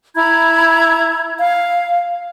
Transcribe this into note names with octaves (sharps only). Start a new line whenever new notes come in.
E4 A#5 B5 G#6
F5